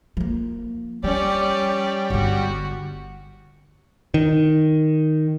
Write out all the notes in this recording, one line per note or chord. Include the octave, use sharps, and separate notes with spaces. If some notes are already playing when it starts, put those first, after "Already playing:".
F3 A#3
F3 G3 C#4 D5
G1 D3 F#4
D#3